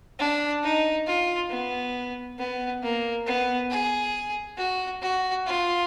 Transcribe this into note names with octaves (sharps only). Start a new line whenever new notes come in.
D4
D#4
F4
B3
B3
A#3
B3
G#4
F#4
F#4
F4